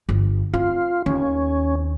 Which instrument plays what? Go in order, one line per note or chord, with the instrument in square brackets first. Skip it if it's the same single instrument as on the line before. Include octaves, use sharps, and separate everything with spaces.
[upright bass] G1
[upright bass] C4 [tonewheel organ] F4
[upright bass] D#2 [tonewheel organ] C#4